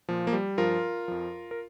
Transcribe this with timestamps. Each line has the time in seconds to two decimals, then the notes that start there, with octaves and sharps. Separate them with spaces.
0.09 A#2 F3
0.27 A#3
0.33 G3
0.58 G2 F3 F4 A#4
1.08 F2 F3
1.51 A#4